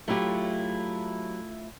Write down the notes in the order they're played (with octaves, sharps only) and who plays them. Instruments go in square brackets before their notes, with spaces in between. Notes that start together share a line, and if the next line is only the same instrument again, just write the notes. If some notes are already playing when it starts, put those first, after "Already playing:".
[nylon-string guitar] F#3 G4 [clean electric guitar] A3 E4 F4